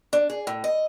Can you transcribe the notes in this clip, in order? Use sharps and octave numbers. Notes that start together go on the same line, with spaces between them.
D4
G#4
A2
D#5